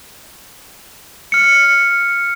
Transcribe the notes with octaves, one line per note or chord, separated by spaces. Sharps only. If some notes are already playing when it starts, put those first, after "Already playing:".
F6 C#7